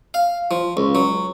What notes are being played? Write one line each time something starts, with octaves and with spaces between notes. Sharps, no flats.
F5
F3
C#2
F#3